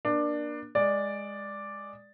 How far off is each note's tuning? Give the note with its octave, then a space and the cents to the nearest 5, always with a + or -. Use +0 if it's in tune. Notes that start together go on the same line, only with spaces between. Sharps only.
A#3 +35 D4 +15
G#3 -10 D5 +0